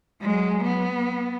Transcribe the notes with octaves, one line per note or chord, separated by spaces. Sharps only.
F#3 G#3
B3